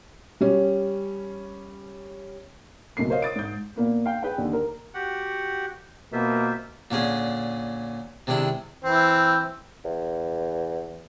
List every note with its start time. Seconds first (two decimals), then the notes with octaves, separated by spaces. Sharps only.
0.41 G3 C#4
2.97 B1 C#3 A3 A#3 C7
3.09 A#4 C5 C#5 D#5 F5
3.22 D#6 A6 D7
3.36 G#2 G6
3.76 A#2 A#3 B3
4.06 F5 G5
4.23 G#4 B4 G5
4.38 D#2 D3
4.53 A#4
4.94 F#4 G4 F#5
6.13 B2 A#3 F4 C5 E5
6.91 A#2 D3 C#4 G#4
8.27 C3 D#3 G#3 D4 E4
8.84 E3 C4
9.85 E2